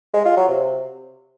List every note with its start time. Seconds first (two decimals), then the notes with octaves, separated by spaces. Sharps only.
0.14 G#3
0.25 F4
0.37 F#3
0.48 C3